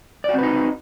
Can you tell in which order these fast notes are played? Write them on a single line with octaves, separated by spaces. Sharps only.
D5 F#4 C4 B4 D#4